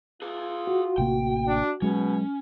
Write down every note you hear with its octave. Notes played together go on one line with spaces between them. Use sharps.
F4 G#4 B4
F#4
A1 C3 A#3 G5
D4
B2 F#3 G#3 C#4